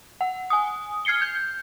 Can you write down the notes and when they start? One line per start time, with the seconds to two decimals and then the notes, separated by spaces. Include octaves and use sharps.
0.21 F#5
0.50 G#5 D#6
1.05 F6 G#6 C7 C#7 G7
1.21 G6